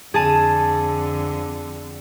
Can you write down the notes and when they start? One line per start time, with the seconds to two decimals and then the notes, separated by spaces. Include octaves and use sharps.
0.14 F2 D3 G#4 A5 D#7